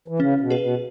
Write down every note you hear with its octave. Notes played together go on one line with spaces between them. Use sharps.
E3
C#3 C#4
B2
G#4 B4
B2